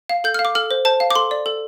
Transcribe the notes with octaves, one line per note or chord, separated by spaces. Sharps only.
F5
A4 G6
F5 F6
D6
A4 F6
C5
C5 A5
F5
D6
A4 C6
D5
A4